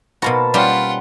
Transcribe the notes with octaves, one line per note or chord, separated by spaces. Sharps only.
B2 A#3 F#4 C5 A5 B5
G3 C#4 F4 G4 F#5 G5